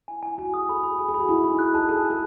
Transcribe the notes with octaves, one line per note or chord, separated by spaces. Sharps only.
E4 G#5
E4 G#5
F#4 G#5
G#4 D#6
A4 B5
G#4 B5
A4 G#5
G#4
F#4 B5
E4 B5
D#4 B5
G#4 F#6
G#4 A5
A4 A5
A5
G#4